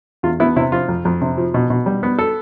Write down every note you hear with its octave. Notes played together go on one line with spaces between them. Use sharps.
E2 F4
B3 E4
C3 E4
F3 F4
F2
F2
C3
F3
B2
B2
G3
B3
A4